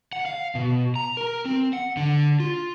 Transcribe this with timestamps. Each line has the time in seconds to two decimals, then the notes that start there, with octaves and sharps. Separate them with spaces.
0.13 F#5
0.26 F5
0.55 B2
0.96 A#5
1.17 A#4
1.45 C4
1.73 F#5
1.97 D3
2.40 F4